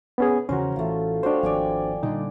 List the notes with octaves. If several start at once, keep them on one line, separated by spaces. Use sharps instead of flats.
B3 C#4 G#4
E2 C#3 F3 C#4 F#4 A#4 C5
A1 E3 A3 F4
D4 F#4 C5 C#5 F5 G5
G#1 D#2 F3 D5 G5 G#5
A#2 D3 G3 D#4